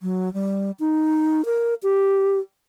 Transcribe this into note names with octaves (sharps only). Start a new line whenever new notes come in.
F#3
G3
D#4
A#4
G4